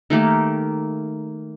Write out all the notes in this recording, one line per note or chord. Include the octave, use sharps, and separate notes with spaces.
D#3 A3 A#3 G4